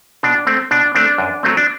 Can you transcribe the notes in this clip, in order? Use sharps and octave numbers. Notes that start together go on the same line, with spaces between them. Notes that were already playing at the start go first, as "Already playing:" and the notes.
B2 D4
A3 C4
B2 D4
A3 C4 D4
F#2
F#3 A3 C4
D4